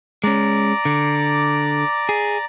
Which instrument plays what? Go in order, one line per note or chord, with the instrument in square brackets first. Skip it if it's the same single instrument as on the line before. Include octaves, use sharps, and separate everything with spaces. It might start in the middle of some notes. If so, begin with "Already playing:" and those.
[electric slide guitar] G#3 C#4 [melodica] D5 A#5 D6
[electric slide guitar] D3
G#4